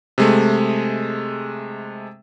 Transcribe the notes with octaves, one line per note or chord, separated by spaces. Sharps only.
C3 G#3 A3